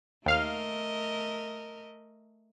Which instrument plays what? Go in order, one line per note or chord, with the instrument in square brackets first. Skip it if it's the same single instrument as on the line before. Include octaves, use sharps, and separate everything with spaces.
[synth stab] D#2 F5 F6 [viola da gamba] A3 A#4 D#5